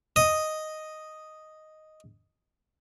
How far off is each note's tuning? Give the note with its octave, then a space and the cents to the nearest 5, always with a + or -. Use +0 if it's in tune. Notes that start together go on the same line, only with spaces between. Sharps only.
D#5 +0 D#6 +0